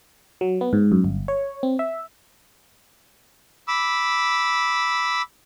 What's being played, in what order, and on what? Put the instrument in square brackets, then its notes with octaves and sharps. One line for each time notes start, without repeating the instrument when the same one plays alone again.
[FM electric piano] F#3
B3
G#2
F#2
G1
C#5
C4
E5
[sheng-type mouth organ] B5 D6 E6